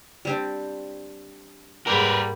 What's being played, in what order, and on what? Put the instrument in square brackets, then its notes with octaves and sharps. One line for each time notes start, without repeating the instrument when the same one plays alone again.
[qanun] G3 C4 D4
[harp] G#2 A#3 [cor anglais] G3 [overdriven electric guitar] A#4 B4